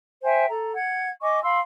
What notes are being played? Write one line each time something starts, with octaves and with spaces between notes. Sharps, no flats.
C5 E5 G5 G#5
A4 A#5
F#5 G#6
D#5 G#5 C#6 D6
F5 B5 C6 E6